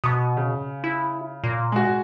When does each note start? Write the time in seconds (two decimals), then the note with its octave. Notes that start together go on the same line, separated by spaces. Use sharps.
0.04 B2 C#6 D#6
0.37 C#3
0.84 E4
1.44 A#2
1.72 G#3 F#4